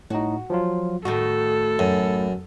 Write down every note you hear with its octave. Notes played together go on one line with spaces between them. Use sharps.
A2 D#4 F#4
F3 F#3 F4
A2 D#3 A3 F#4 A4
F#2